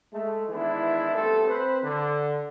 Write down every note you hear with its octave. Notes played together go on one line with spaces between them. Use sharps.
G#3 A3
D#3 E3 G#3 B3 D4 E4
G3 A3 B3 C4 A4
C4 B4 C5
D3